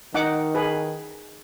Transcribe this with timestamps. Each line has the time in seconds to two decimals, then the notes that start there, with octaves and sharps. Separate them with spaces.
0.14 D#3 D#4 F#5 D6
0.55 G#4 B4